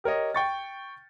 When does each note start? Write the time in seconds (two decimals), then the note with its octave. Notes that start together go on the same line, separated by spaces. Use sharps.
0.04 G4 A#4 C#5 D#5
0.34 G5 C#6 A6